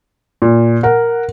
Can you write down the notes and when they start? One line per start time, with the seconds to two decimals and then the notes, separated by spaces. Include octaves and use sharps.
0.42 A#2
0.83 A#4 F#5